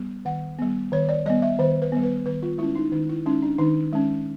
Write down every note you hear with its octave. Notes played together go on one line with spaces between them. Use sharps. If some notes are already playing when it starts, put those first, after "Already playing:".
Already playing: G3 B3
D#3 F#5
G3 B3
D#3 C#5
D5
G3 B3 D#5
E5
D#3 C5
B4
G3 B3
B4
D#3 B4
F4
G#3 C#4 E4
D#4
D#3 D#4
E4
G#3 C#4 D#4
D4
D#3 D#4
G#3 C#4